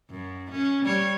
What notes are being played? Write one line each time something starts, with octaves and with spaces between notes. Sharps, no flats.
F#2
C#4
G3 C#5